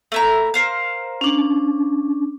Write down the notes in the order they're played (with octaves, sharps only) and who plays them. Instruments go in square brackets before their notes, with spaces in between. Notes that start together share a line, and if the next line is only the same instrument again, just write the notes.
[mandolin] A3 E4 A#5
A#4 C5 F5
[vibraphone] C#4 D4